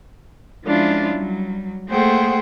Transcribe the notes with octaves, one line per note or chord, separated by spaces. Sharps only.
F3 G#3 C#4 D4 E4 F4
F#3 G3
A3 A#3 G#4 C5 F#5 G5